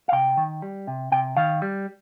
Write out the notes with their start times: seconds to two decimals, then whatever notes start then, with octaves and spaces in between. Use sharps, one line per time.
0.08 F5
0.12 C3 G5
0.37 D#3
0.62 G3
0.87 C3
1.12 C3 G5
1.37 D#3 F5
1.62 G3